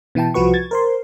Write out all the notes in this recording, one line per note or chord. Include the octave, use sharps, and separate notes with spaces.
B2 E3 E4 G5 A5
C2 F3 F#4 B4 C#6
G#6 A6
A#4 C5 C6